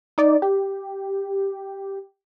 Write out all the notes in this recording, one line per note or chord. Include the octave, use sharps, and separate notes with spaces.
D#4 D5
G4